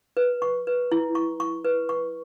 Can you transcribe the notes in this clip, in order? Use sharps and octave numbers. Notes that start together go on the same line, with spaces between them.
B4
C#6
B4
E4
C#6
C#6
B4
C#6